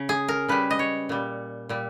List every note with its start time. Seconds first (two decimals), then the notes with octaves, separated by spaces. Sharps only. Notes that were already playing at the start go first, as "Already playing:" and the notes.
Already playing: C#3
0.09 G#4
0.28 A#4
0.48 C#3 G3 B4
0.71 D#5
0.79 C#5
1.09 A#2 G3
1.69 A#2 G3